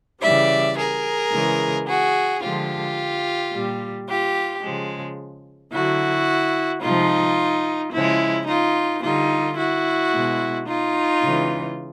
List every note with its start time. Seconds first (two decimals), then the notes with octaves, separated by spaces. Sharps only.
0.22 C#3 E3 G3 D5 E5
0.77 G#4 A#4
1.33 C#3 E3 G#3
1.88 F#4 G#4
2.43 D3 F3 G#3 F4 G4
3.52 A#2 G3
4.08 F4 G4
4.62 C#3 F3 G#3
5.72 D3 F#3 E4 F#4
6.82 C3 F3 G#3 D#4 F4
7.93 C#3 F3 G#3 E4
8.47 D#4 F4
9.02 D3 G3 D#4 F4
9.58 E4 F#4
10.12 B2 G#3
10.67 D#4 F4
11.22 C#3 E3 G#3